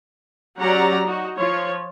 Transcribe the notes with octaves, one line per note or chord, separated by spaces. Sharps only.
F#3 C#4 G4 D5 F#5 A#5
D#4 F#4
F3 F4 C#5